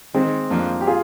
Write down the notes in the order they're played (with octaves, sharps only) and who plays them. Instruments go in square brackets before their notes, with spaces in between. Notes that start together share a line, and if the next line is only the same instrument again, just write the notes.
[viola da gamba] D#3 [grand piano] G#3 C4
[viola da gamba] F2 F3 [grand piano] A#3 D4
[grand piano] G4
F4 G#4